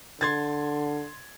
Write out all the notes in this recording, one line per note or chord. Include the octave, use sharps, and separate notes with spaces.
D3 C6 G#6 A6